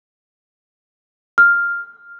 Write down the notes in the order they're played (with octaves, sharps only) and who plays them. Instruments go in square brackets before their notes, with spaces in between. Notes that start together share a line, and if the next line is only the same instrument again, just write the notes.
[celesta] F6